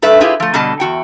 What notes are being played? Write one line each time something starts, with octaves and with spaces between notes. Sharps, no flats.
G2 A4 B4 E5
E4 F4 G4 G#4 B4
F3 A3
B2 D3 G3 D#5 A5
E2 F#4 G5